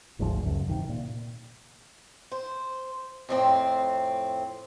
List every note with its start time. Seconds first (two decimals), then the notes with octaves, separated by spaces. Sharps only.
0.19 G1 D2 G#2 F3
0.41 C#2 F#2
0.69 C3 D#3
0.89 A#2
2.31 C5
3.29 F2 A2 C4